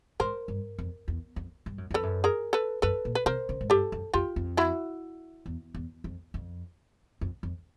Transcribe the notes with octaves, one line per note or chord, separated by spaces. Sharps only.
G#2 A#4 C5
G2
F2
E2
F2
G2
F#2
F2 A4 B4
F#2
G#4 A#4
A4 B4
F#2 A4 B4
A#2
B4
C3 A#4 C5
C#3
G#2
G2 G4 A4
F#2
F2 F4 G4
F2
E4 F#4
E2
E2
F2
F2
F2
F2